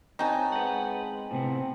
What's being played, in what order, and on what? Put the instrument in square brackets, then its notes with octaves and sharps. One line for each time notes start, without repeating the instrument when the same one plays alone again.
[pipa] F#3 D#4 [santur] C4 G#5 A5
[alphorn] G#3 [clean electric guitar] B4 F#5
[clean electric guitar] A2 C3 B3 [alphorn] C4